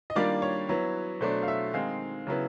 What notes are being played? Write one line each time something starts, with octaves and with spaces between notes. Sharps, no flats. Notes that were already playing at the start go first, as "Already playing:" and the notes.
D#5
D#3 G3 A#3 D4 F4 D5
C#5
F#3 B3 E4
B2 F#3 A3 D4 C5
F5
E5
D#3 G#3 C4 D#4 F5
C#3 F#3 B3 E4